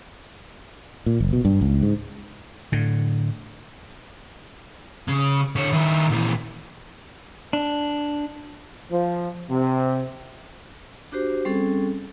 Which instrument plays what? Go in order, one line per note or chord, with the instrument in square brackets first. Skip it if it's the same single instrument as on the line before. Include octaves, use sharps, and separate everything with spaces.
[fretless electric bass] A#2
F#1
B2
G2
C#2
G#2
[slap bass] A2 D3
[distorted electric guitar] C#3
D3 C#5
D#3 E4
A#2 E3
[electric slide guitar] D4
[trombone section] F3
C3
[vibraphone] D4 F#4 G4 C5
G3 C4 C#4 G#4 A4